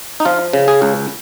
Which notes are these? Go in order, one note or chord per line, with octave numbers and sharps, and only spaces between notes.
D#4
F3 F4
C#3
G#4
C#2